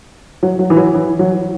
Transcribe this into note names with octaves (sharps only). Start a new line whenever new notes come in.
F#3
F#3
E3
F#3
E3
F#3